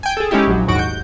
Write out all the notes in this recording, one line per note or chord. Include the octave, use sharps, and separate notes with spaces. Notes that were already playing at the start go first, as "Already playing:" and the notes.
G5 G#5
G#4 A4
G#3 C#4 D#4 E4 G4
A#1 F#3
D#2 G#2 F#4 D7
G6